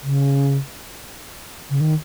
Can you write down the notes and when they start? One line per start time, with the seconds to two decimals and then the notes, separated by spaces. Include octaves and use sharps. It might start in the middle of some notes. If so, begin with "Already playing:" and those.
0.03 C#3
1.70 C#3
1.80 D#3